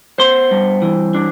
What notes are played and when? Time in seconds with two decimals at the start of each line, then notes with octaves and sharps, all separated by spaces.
0.18 B3 C5 C6
0.51 G2
0.82 E3
1.15 D4